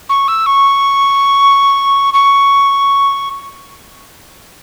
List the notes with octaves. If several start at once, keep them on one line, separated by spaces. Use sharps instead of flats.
C#6
E6
C#6
C#6